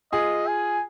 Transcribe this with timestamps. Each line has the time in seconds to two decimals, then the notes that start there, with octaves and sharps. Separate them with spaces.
0.12 F4 G#4 D#5
0.47 G#5